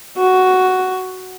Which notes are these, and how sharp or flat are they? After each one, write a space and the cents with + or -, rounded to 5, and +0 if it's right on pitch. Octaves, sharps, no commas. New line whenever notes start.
F#4 +5